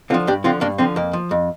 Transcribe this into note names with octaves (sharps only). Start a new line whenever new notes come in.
D3 F3 C4 F4
G2 D4 G4
D3 F3 C4 F4
G2 A#3 D4
D3 F3 C4
F2 A#3
F3
F2